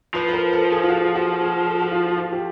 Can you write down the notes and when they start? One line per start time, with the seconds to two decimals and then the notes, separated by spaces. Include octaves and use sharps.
0.14 F3 B4
0.28 B4
0.33 A#4
0.53 A4
0.72 G#4
0.83 F4
0.90 F#4
1.15 F#4
1.42 G#4
1.66 A4
1.82 F#4
1.91 F4
2.06 F#4
2.17 F4
2.32 G4